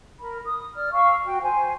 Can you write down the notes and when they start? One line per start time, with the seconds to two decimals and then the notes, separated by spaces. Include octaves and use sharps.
0.20 A#4 B5
0.45 D#6
0.74 D5 F6
0.93 F5 C#6 E6
1.25 F#4 G5
1.42 C5 G#5